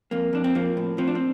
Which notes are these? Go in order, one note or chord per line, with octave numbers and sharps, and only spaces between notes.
F2 A#3
F2 D4
C4
F3 A#3
A2
F3 C4
D4
C4